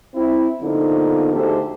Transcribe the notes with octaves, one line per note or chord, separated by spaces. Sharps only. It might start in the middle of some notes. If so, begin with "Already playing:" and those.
C4 E4
D3 F3 A#3 B3 D#4
D2 G#2 G4 A4 C5